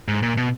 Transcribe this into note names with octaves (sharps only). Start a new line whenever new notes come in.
G#2
A#2
B2